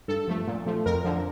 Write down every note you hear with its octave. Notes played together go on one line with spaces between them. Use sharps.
G2 A4
F3 A3
A#2
F3 A3
F2 A#4
D3 F3